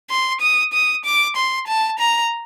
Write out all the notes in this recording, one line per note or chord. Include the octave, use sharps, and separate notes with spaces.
C6
D#6
D#6
D6
C6
A5
A#5